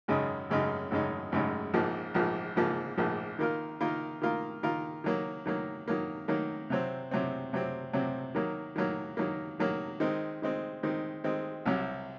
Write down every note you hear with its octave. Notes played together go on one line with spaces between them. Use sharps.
G#1 F#2 C#3 G#3 D#4
G#1 F#2 C#3 G#3 D#4
G#1 F#2 C#3 G#3 D#4
G#1 F#2 C#3 G#3 D#4
A#1 G#2 F3 A#3
A#1 G#2 F3 A#3
A#1 G#2 F3 A#3
A#1 G#2 F3 A#3
D#3 A#3 F4 A#4
D#3 A#3 F4 A#4
D#3 A#3 F4 A#4
D#3 A#3 F4 A#4
D#3 F#3 A#3
D#3 F#3 A#3
D#3 F#3 A#3
D#3 F#3 A#3
C3 F#3 C4
C3 F#3 C4
C3 F#3 C4
C3 F#3 C4
D#3 F#3 A#3
D#3 F#3 A#3
D#3 F#3 A#3
D#3 F#3 A#3
D#3 G#3 C4
D#3 G#3 C4
D#3 G#3 C4
D#3 G#3 C4
C2 C3 F#3